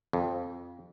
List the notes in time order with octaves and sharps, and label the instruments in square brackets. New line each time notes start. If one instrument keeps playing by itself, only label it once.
[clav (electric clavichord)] F2